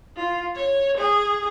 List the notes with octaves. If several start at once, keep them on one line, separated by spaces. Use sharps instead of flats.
F4
C#5
G#4